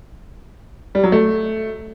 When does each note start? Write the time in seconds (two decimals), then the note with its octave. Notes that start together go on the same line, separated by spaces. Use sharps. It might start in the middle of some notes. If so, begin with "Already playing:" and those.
0.95 G3
1.04 F#3
1.12 A3